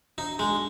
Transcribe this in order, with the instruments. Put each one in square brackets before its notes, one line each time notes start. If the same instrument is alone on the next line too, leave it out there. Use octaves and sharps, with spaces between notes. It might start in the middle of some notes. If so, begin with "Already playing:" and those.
[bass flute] D4 [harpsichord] D#4
[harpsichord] G#3